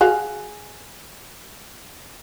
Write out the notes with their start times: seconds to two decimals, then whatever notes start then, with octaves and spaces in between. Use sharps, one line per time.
0.01 F#4 G#4 F5